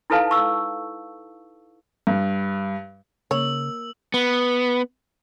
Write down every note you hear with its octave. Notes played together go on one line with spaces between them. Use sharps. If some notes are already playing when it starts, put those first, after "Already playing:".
D#4 E4 A4 B4 F5 A5
C#6 E6
G2
C#3 A#3 C#5 E6 F#7
B3